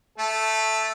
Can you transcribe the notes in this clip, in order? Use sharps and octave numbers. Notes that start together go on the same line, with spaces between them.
A3 A4